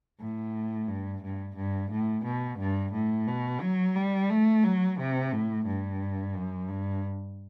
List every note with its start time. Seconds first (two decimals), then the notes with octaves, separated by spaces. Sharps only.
0.20 A2
0.88 G2
1.23 G2
1.57 G2
1.91 A2
2.25 B2
2.59 G2
2.93 A2
3.27 B2
3.62 F#3
3.95 G3
4.30 A3
4.64 F#3
4.98 C3
5.32 A2
5.67 G2
6.35 F#2
6.69 G2